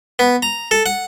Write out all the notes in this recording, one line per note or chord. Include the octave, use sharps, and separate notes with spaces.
B3
A#5
A4
F#5